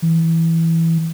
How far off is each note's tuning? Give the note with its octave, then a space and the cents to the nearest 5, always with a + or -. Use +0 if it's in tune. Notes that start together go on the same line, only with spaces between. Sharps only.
E3 -5